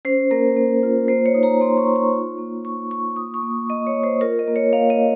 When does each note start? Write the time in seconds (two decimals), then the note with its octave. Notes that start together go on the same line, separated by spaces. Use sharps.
0.05 C#4 C5
0.31 A#3 A#4
0.57 A#3
0.83 F4
1.08 A#3 C5
1.26 C#5
1.34 D#4
1.43 A#5
1.61 A#3 C6
1.78 C#6
1.87 D#4
1.96 C#6
2.12 F4
2.38 A#3
2.65 F4 C#6
2.91 F4 C#6
3.16 A#3 D#6
3.34 C#6
3.43 A#3
3.70 A#3 D#5
3.87 C#5
3.95 A#3
4.04 C5
4.21 F4 A#4
4.39 D#5
4.47 A#3
4.56 C#5
4.73 A#3 F5
4.90 D#5
4.99 A#3